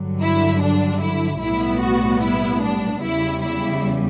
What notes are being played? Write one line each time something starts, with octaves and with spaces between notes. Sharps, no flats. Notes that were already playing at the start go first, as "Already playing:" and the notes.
Already playing: G2 D3 F#3
E4
D4
E4
B1 A2 G3 B3 E4
F#4
E4
D4
E2 C#3 G3 E4
E4